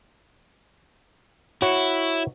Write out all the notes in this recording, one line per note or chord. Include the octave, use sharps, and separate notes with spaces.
E4 F#4 C#5 F#5